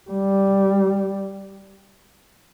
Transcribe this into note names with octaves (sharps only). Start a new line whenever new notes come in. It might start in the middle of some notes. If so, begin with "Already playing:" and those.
G3